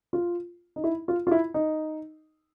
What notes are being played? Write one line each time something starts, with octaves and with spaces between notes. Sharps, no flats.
F4
D#4
E4
F4
F4
E4
D#4